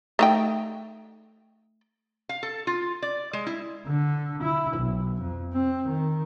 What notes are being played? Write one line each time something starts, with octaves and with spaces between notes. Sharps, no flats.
A3 D#4 G5
F5
A4
F4
D5
G#3
E4
D3
E4
B1
F2
C4
D#3